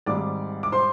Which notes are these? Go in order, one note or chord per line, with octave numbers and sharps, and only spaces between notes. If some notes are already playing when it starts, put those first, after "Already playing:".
G#1 G#2 G3 D5 D6
D6
C5 C6